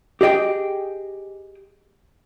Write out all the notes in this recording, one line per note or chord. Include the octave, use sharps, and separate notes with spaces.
G4 G#4 D#5 G5